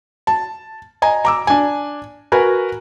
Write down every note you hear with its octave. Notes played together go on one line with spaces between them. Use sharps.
A5
D#5 G#5 A#5
A#5 D6 E6
D4 G#5
F#4 A#4 B4 G#5